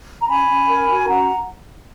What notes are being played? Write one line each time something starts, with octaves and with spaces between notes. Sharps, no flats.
A#5
C#4 G#5 B5
C#4
A#4
F#4
C#4 F#5 A#5